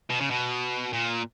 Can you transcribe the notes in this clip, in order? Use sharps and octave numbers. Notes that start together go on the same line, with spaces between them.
B2
C#3
B2
A#2